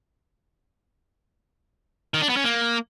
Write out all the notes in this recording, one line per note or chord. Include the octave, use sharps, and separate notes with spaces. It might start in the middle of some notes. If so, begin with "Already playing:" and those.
D#3
D4
B3
C#4
A#3